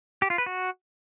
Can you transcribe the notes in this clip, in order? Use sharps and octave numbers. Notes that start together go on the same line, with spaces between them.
G4
F4
B4
F#4